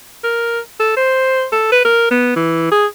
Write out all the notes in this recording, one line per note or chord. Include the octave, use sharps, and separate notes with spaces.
A#4
A4
C5
A4
B4
A#4
B3
E3
G#4